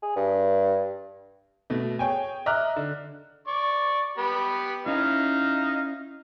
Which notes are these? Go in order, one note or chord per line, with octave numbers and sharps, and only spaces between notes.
G#4
G2
B2 A3
G#4 C#5 G5 G#5
D#5 E5 A#5 D6 F6 F#6
D3
D5 C#6
B3 G4 B5
C#4 D#4 E4 F5